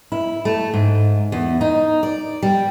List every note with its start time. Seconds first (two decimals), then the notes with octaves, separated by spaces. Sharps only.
0.12 E4
0.45 A3
0.74 G#2
1.32 E2
1.61 D#4
2.03 D5
2.42 G3